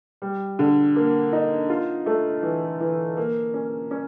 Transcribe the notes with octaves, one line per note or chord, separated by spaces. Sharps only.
G3
D3
A#3
D#4
F4
A3
E3
E3
A#3
C#4
C#4